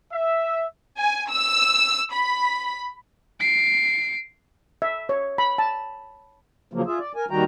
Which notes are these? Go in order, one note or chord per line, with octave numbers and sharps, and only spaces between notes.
E5
G#5
E6
B5
C7 D7
E5
C#5
B5
A5
C#3 F3 F#3 A#3
F4 G#4 E5
D5
A#4 G#5
D#2 D#3 G3 F#4 G5 A#5